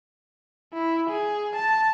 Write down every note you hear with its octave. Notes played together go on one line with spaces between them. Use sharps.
E4
G#4
A5